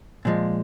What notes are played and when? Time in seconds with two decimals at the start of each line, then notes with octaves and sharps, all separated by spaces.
0.25 A#2 F3 G#3